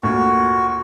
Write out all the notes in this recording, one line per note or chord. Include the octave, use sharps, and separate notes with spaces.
D2 A#2 F#4